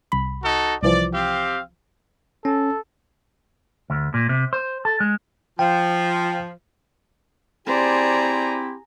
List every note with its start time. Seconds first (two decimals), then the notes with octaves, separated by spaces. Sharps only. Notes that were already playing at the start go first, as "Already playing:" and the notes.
0.12 C2 B5
0.43 D#4 F#4 A4
0.83 C2 E3 F3 D5
1.13 C4 G4 F5
2.45 C#4 A4
3.90 D2
4.14 A#2
4.29 C3
4.53 C5
4.85 A4
5.00 G#3
5.59 F3 G5
7.67 C4 E4 G4 G#4 C5 D5 A#5